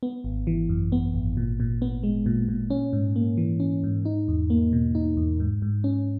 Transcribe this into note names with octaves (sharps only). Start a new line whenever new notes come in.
B3
G#1
E3
F#2
B3
G#1
A#2
A#2
B3
G#3
A#2
A#2
C#4
G#2
A#3
E3
C#4
G#2
D#4
E2
A#3
B2
D#4
E2
G#2
G#2
C#4